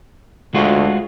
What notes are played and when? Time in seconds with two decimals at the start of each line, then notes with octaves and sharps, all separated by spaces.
0.54 D2 G#3 F4 F#4